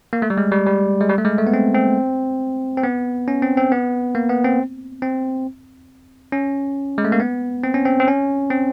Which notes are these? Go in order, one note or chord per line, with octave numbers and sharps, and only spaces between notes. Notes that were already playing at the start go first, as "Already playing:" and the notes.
A#3
A3
G3
G#3
G3
G3
G#3
G3
A3
G#3
A3
B3
C4
C4
C4
B3
C#4
C4
C4
B3
A#3
B3
C4
C4
C#4
G#3
A3
A#3
B3
C4
C#4
C4
C4
C#4
C4